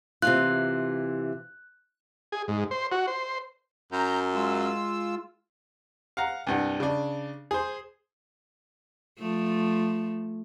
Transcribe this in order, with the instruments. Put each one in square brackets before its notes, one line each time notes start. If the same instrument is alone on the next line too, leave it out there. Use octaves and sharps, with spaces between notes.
[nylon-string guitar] C3 E3 F4 [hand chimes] F#6
[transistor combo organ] G#4
G#2
C5
F#4
C5
[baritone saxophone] F#2 [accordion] A#5 G6
[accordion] G#3 F4 E6
[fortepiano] F5 F#5 A#5
C2 G2 F#5
C#3 D4
G#4 C5
[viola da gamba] F3 A3